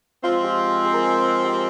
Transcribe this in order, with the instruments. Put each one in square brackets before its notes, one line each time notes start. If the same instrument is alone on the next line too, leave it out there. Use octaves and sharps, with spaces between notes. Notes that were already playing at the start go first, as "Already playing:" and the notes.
[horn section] F3 G#3 C4 [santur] F4
[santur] G4
G4
G#4
A#4
G#4
G4